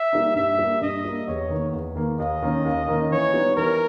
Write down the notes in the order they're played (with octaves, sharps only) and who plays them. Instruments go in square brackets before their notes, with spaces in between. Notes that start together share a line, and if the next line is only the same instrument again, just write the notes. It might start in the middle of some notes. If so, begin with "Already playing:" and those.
Already playing: [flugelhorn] E5
[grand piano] G3 A#3 D#4
[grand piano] G2 [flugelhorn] E5
[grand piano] G3 A#3
[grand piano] G2 [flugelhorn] D#5
[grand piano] G3 A#3
[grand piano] E2 [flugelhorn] C#5
[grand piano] D#3 A#3
E2
D#3 A#3
[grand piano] D#2 [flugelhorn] D#5
[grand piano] D#3 A#3 C#4
D#2
D#3 A#3 C#4
[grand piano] E3 [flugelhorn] C#5
[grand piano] G3 B3 D#4
[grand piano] E3 [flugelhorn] A#4